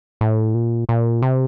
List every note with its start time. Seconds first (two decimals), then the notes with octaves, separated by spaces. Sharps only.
0.21 A2
0.54 A#2
0.89 A#2
1.22 C3